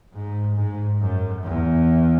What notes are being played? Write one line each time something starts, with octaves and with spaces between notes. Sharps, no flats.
G#2
G#2
F#2
E2